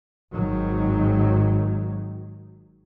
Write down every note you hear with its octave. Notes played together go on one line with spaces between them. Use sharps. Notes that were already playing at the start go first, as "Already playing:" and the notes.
G#1 D#3 F#3